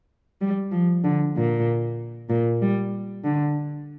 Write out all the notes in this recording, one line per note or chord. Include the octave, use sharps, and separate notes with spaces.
G3
F3
D3
A#2
A#2
G3
D3